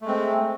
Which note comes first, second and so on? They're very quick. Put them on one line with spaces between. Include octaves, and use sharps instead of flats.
A3 G#3 C4